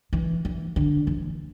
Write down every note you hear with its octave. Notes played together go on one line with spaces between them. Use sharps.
E3
E3
D3
E3